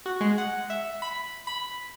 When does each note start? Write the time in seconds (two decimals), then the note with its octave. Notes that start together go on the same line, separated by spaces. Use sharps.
0.06 F#4
0.21 G#3
0.38 F#5
0.70 E5
1.02 B5
1.47 B5